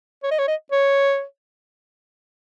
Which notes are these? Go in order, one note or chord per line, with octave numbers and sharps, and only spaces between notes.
C#5
D#5
C#5
D#5
C#5